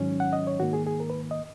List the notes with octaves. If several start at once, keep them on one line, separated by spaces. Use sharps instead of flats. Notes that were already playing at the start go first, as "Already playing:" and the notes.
Already playing: G#2 D#3 F#3 C#4
F#5
D#5
C#5
G#2 D#3 A#3 F#4
G#4
G#4
A#4
B4
D#5